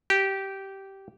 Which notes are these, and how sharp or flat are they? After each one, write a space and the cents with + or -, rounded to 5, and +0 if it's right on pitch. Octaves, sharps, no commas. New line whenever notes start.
G4 -15